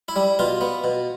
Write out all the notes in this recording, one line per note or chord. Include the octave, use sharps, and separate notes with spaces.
E4
G3
B2 F4
B3
B2